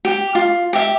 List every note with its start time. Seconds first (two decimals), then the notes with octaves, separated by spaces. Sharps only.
0.05 G4
0.35 F4
0.73 G4 E5